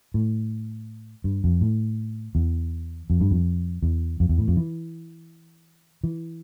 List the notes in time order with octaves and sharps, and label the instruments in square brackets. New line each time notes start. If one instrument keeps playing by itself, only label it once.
[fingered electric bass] A2
G2
F2
A2
E2
F2
G2
F2
E2
F2
E2
A2
F2
E3
E3